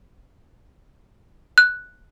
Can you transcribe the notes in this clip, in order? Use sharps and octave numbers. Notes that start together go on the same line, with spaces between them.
F#6